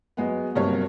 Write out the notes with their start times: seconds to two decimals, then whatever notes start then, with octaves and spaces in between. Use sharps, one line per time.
0.17 F#3 G#3 B3
0.56 G2 C3 F#3 A#3 C4 C#5